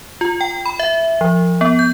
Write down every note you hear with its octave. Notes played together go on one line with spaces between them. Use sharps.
F4
G5
B5
E5
F3
B3
G6